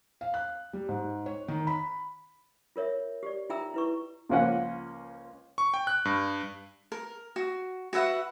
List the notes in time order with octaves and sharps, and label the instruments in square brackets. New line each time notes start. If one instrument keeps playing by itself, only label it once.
[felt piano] F5
F#6
G3
G#2
C#5
D#3
B5
[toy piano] F4 A#4 C#5 E5
G4 D5
D#4 F4 E5 G5 A#5 E6
E4 B4 C#6
[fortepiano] C#2 F3 A#3 C#4 F#5
[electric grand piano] C#6
G5
F#6
G2
[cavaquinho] A#4
F#4
F#4 B4 E5 F#5